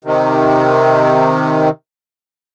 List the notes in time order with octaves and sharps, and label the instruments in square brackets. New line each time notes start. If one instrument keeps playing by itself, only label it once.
[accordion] C3 D#3